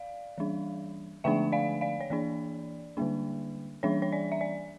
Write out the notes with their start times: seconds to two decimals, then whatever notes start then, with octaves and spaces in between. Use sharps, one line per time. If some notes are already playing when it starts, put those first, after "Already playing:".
Already playing: D5 F5
0.38 E3 G3 D4
1.24 D3 F3 A3 D4 E5 G5
1.52 D5 F5
1.81 D5 F5
2.01 C#5
2.10 E3 A#3 D4 D5
2.97 D3 G3 A#3 D4
3.83 E3 G3 D4 C#5
4.02 C#5
4.12 D5
4.32 E5
4.41 D5